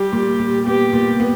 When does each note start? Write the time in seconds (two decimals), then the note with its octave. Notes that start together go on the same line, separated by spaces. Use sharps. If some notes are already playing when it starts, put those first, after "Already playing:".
Already playing: G3 G4
0.12 A#2
0.39 A#2
0.66 B3 G4
0.93 A#2
1.20 B3